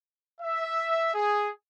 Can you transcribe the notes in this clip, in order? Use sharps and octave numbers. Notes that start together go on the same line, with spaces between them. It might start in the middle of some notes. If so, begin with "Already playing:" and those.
E5
G#4